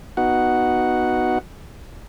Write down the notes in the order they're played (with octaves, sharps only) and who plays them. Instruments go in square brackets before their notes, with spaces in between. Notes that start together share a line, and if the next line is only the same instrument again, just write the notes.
[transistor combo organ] B3 D#4 F#4 F#5